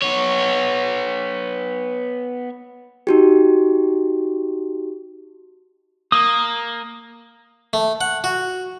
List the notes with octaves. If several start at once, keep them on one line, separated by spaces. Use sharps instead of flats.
B3 C#5
D#4 F#4 G4
A#3 D#6
A3
F#5
F#4